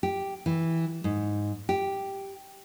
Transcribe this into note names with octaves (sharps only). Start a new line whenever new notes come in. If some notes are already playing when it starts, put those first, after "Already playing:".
G4
E3
G#2
G4